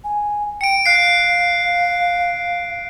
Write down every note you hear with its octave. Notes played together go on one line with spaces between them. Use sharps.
G#5
G5 C#7 D7
F5 F#6 C7